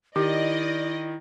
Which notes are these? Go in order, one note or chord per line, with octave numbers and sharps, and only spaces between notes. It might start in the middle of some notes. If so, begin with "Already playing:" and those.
D#3 E4 G4 D5 D#5